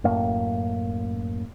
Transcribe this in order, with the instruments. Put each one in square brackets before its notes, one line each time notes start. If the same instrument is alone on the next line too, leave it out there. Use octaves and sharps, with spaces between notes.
[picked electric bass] F#2 A2 A#3